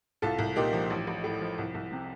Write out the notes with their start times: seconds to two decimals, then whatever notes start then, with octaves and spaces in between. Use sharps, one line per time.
0.22 C2 F4 A4
0.39 C2
0.56 A#2 D#4 G4
0.73 F3
0.90 A1
1.07 A1
1.24 A2
1.41 F3
1.58 C2
1.74 C2
1.92 C3